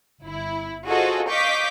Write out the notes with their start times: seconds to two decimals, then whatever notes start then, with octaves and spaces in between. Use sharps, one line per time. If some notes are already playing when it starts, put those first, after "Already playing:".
0.23 G1 E4
0.85 F4 F#4 G#4 A4 C5 D#5
1.29 D#5 F5 C#6 D6 G6 B6